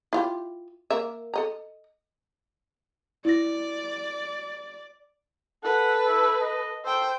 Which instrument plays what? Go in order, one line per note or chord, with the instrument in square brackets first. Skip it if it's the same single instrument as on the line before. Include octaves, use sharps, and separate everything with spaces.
[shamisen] E4 F4 G4
A#3 A#4 E5
A4 D#5 A#5
[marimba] E4 A#6 [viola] D5
[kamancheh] A4 B4 [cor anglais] F#5
[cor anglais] E4
D#5
[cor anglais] A4 [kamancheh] C5 G5